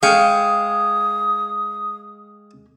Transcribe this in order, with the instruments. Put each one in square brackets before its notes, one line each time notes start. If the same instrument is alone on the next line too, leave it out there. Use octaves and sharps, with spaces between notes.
[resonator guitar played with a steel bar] G#3 [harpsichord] F5 G5 C#6 [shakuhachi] D#6